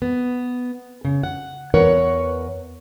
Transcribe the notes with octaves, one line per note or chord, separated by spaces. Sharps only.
B3
C#3
F#5
E2 A#4 B4 C#5 F#5